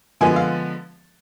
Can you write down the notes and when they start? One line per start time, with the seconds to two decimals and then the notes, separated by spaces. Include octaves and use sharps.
0.21 D3 F3 G#3 B3 G#5
0.36 F5